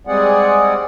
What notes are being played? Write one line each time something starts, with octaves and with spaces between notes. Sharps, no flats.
G3 G#3 C4 G#4 D5 F#5